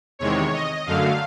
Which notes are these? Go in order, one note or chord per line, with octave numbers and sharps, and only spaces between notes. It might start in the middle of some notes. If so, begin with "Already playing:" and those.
E2 C3 D#3 G#3 C#5
D#5
F#2 D3 F#3 A3 F5